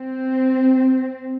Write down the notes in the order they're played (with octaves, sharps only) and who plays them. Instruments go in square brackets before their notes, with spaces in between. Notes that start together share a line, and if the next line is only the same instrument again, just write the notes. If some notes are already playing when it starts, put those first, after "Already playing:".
Already playing: [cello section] C4